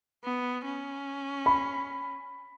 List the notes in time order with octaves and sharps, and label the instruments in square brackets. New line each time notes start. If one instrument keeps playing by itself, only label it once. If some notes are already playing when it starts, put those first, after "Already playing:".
[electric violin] B3
C#4
[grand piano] B5